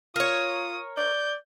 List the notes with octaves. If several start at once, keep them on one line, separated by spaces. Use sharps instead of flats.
F4 A#4 C#5 D#6
D5 G6